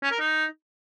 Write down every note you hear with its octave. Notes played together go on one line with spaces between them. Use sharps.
C#4
A#4
D#4